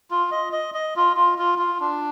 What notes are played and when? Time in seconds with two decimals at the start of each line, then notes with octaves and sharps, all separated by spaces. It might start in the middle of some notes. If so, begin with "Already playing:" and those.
0.11 F4
0.31 D#5
0.53 D#5
0.74 D#5
0.96 F4
1.16 F4
1.38 F4
1.58 F4
1.80 D4